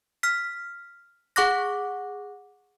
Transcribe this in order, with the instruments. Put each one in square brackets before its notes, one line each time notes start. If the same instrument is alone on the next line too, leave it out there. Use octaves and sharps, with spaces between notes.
[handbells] F6 B6
G#4 F#5 C#6 D6 F#6 A#6